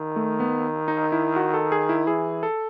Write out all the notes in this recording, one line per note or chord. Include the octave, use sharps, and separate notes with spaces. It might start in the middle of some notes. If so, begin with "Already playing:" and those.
Already playing: D#3
A3
B3
D#4
E4
F#4
A4
G#4
E4
E3 G#4
A4